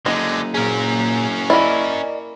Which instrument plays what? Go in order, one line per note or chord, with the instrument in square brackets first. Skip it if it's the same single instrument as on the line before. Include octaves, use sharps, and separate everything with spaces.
[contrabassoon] F#1 [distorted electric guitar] D3 G#3 [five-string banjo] D#4
[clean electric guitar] A#2 G#4 [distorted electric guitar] C#4 A#4
[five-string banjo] A#3 E4 [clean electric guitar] D5 D#5